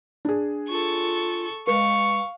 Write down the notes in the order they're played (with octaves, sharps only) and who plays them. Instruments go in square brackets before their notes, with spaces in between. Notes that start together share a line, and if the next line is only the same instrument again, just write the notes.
[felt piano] D4 G#4
[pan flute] F4 [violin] A4 C#6
[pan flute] G#3 [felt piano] B4 [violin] F5 [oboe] C#6